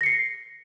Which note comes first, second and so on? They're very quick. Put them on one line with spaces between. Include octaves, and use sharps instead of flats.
A#6 C#7 C7